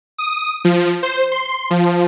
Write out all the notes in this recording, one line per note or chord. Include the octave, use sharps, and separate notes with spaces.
D#6
F3
C5
C6
F3